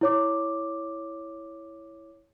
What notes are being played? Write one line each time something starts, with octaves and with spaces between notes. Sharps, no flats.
E4 C#5 D6